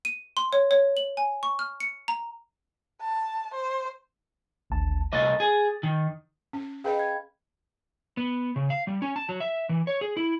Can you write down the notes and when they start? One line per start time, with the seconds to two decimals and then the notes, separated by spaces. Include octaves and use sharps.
0.05 D#7
0.37 C6
0.53 C#5
0.71 C#5
0.97 F#7
1.17 G#5
1.43 C#6
1.59 F6
1.80 C#7
2.08 A#5
3.01 A5
3.54 C5
4.70 G#1 D2 A5
5.13 C2 A3 D#5 D6 A6
5.40 G#4
5.83 D#3
6.53 C#4
6.84 G#4 B4 D#5 F5 G5 B5
6.99 G#6
8.17 B3
8.56 C#3
8.70 F5
8.87 G3
9.02 C#4
9.16 A5
9.29 F#3
9.40 E5
9.69 E3
9.87 C#5
10.01 G#4
10.17 E4